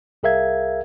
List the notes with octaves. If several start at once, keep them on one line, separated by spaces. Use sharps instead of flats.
C2 G#4 A#4 E5 F5 G#6